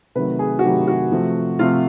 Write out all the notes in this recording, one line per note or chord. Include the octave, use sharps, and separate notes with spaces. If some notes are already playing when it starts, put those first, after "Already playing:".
C3 D#3 F#3 A3 B4
G#4
F#4
C3 D#3 F#3 A3 G4
F#4
C3 F3 A3
C3 F3 A3 F4